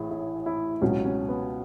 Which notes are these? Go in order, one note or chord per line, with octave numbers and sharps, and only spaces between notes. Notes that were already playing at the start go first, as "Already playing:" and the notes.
Already playing: A1 A2 E4 G#4
E4
E4
C#2 B2 F#3 C#4
C#4
B3